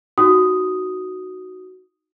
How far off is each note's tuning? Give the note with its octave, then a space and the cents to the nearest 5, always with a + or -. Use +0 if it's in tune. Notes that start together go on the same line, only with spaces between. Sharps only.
D#4 +0 F#4 +0 D#6 +0